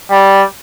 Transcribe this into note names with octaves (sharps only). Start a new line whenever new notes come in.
G3